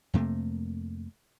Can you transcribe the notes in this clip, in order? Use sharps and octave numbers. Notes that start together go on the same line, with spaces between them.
F2 C3 A3 A#3